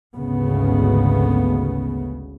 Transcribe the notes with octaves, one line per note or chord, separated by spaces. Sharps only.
G#1 D2 C#3 B3